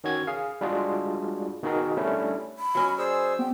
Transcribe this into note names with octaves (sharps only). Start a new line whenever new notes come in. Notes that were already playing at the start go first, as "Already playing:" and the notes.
D#3 C#4 F#4 G#6
G#4 F5
G3 G#3 D4 F4 F#4 G#4
B2 D#3 D#4 F#4 G#4 A#4
G3 A3 C#4 D4 E4
B5
F#3 C#4 D#5
G#4 C5 D5 E6
B3 G5